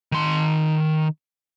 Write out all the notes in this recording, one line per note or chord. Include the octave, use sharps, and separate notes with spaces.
D#3 C6